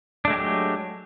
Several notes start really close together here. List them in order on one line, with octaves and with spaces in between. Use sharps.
D4 A3 G#3 G4 F#3